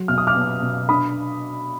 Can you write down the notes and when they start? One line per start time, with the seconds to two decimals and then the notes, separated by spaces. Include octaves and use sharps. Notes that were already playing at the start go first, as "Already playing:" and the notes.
Already playing: F#3
0.08 B2 F6
0.18 D#6
0.27 D6 F6
0.35 B3
0.62 B2
0.89 D4 B5 D#6